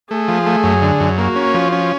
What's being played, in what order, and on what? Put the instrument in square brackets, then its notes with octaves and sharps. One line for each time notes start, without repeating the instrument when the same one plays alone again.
[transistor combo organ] A3 [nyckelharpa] G#4
[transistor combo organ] F3
A3
F#2
D3
F#2
[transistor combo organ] A#3 [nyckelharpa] F#4
[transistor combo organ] C#4
F3
C#4